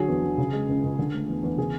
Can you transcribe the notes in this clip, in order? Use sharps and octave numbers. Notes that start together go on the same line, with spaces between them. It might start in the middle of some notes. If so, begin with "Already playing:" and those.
Already playing: D3 F#3 G#4
E2
E2
C#3
G#3
C#2
C#2
D3
A3
E2
E2
C#3 G#4